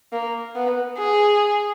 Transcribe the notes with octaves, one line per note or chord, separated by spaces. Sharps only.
A#3
B3
G#4